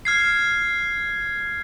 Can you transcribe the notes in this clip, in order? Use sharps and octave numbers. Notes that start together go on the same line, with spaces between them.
F6 G#6 C7